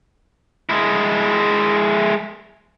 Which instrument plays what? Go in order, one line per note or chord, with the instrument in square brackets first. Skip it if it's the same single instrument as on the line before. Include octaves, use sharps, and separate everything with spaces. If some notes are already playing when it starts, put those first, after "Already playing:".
[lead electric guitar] G#3 E4